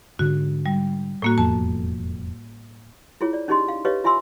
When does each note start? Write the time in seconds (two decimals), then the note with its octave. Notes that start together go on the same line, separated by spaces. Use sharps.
0.19 G#2 D3 F#4
0.66 G3
1.22 A2 A#3 F#4
1.38 E1 F2 B3 A5
3.21 E4 F4 G#4 C#5
3.33 D5
3.48 C#4 D#4 G4 G#4 D#5 C6
3.68 F5
3.85 G4 B4 C#5 D#5 F5
4.04 F4 E5 G#5 C6 E6